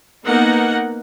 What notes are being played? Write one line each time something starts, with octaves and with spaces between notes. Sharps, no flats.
A#3 B3 D#4 A#4 F#5